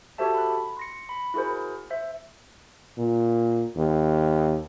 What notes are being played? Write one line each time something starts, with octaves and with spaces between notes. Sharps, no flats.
F#4 G4 A4 C5 E5 A5
B5 F#6
C6 A#6 C#7
B5
E4 F#4 G#4 A#4 C5
C5 E5
A#2
D#2